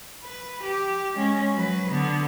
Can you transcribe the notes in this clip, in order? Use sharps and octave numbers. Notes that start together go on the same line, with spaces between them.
B4
G4
G#3 C#4
F#3 B4
D3 B3